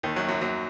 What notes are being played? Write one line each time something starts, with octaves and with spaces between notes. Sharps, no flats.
D#2 D#3
F#2 F#3
F#2 F#3
F#2 F#3